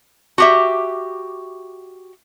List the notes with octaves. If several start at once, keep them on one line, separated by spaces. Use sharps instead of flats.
F#4 G4 E5